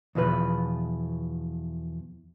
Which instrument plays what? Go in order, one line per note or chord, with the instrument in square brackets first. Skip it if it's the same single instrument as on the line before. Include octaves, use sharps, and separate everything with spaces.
[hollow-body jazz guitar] E2 B2 F3 B4